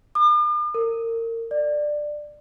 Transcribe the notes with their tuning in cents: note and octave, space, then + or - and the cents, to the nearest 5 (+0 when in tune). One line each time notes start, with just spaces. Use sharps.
D6 +45
A#4 -30
D5 +15